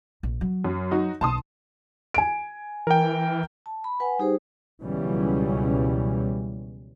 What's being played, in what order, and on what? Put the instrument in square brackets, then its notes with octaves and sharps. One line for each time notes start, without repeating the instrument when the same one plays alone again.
[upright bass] A#1
F#3
[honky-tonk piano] F#2
D#4 F#4
[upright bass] B1 [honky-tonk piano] A5 C6 D#6
[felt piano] G#5 D7
[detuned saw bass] E3 [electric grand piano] A#4 G5
[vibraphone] A5
B5
B4 F#5 G#5
G3 D#4 G4 G#4 C5
[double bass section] C#2 B2 E3 F#3 G3 C#4